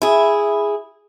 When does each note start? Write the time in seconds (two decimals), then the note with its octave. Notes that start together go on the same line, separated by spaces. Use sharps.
0.02 E4 G#4